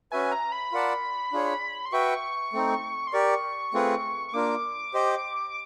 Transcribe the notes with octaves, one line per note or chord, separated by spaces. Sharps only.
C#4 F#4 B4 E5 G#5
A#5
B5
F4 A#4 D5 F#5 A5
D4 F4 G#4 C#5
C6
F#4 B4 E5 G5 C#6
A3 C4 D#4
C6
G4 A#4 D5 C#6
A3 C4 F4 G#4 B4
C#6
A#3 D4 F4 A#4 D6
G4 C5 D#5